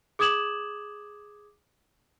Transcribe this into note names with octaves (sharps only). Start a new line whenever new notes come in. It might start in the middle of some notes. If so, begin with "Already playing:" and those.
G#4 D6 D#6 G#6 E7 F#7